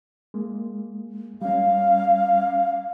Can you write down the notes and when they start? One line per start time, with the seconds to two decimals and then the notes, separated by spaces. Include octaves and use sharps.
0.34 G#3 A#3
1.42 G3 C#4 F5